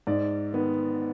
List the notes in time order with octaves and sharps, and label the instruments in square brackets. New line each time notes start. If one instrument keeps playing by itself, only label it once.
[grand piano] G#2 D5
D#3 B3